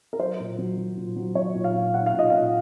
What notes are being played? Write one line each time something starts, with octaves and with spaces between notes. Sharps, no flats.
A#4
F#3 C5
A#2
F#3
F#3
A#2
F#3
F#3 C#5
A#2
F5
A#2
A#2 F#5
F5
A#2
D#5
A#2 F5